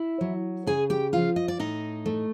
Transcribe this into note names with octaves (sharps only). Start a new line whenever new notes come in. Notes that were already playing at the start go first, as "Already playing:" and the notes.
Already playing: E4 E5
F#3
C#3 G#4 G#5
G4 G5
F3 F4 F5
D#5
D5
A2 D#4 D#5
A3